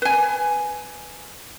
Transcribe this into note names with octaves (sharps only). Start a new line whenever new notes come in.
B4 G#5